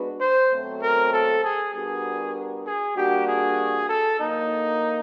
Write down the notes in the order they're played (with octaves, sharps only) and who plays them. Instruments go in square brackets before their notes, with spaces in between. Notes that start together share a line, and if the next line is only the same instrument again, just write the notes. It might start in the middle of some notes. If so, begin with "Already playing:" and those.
Already playing: [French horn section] G#3 B3 D4 F#4 B4
[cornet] C5
[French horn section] B2 F#3 A3 C4
[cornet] A#4
A4
G#4
[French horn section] G3 B3 D4 F#4 A#4 [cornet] G#4
[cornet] G#4
[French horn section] G3 A#3 D4 F#4 [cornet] G4
[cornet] G#4
A4
[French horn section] D3 F#3 A#3 [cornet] D#4